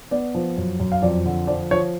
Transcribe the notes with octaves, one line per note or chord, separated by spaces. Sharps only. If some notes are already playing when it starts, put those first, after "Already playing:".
B3 D5
F3
F#2
F#2
F5
F2 D5
D3
F3 D5
F3 C#5